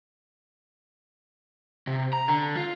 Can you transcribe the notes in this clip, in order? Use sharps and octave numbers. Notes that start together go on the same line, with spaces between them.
C3
A#5
D3
F4